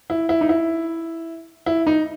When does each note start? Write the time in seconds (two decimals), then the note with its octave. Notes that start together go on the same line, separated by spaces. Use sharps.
0.10 E4
0.29 E4
0.41 D#4
0.49 E4
1.66 E4
1.87 D#4